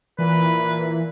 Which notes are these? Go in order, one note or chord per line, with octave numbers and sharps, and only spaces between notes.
A#2 E3 B4